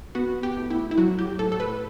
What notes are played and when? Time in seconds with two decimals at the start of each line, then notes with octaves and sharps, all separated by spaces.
0.15 B3 F#4
0.43 G4
0.57 A2
0.70 E4
0.91 E4
0.98 F#3 F#4
1.19 G4
1.39 A2 A4
1.52 A4
1.60 B4